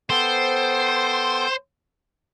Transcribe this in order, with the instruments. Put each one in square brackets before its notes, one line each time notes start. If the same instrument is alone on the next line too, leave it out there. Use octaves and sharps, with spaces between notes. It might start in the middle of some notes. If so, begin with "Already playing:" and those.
[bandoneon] B3 A4 G5 [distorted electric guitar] C5